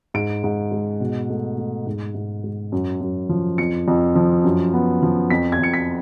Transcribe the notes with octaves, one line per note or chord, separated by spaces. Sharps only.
G#2 D7
G#2
G#3
B2
A3
A3
G#2
G#2
G#3
F#2
F#2
F3
F2 C#7
F2
F3
F#2
B3
F3
F2 B6
G#6
F2 C#7
B6